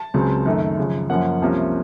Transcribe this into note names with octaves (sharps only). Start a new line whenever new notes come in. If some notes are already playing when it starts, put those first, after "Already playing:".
Already playing: A5
C#2 C#3 F#3 C4
F#2 D#3 A3
F#2 C#3 F3
F#2 F3 A#3 C#4 F#5
C2 C3 F3 A#3 C#4